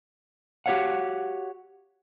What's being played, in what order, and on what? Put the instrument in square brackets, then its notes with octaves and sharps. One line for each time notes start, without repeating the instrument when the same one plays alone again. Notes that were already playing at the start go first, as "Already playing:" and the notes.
[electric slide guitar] F#4 G4 A#4 C#5 F5 F#5